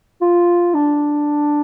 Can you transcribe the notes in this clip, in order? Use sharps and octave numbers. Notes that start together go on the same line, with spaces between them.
F4
D4